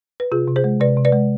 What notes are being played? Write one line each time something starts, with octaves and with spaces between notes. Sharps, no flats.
B4
C3 F4 G#4
C3
G#4 C5
G#3
C3 B4 D5
C3
B4 D5
G#3